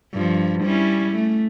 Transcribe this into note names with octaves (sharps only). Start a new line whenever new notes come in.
G2 F3
G3 C#4 E4
A3